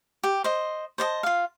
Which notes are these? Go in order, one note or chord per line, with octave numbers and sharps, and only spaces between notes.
G4
C5 D#5
C5 D5 D#5 A5
F4 F5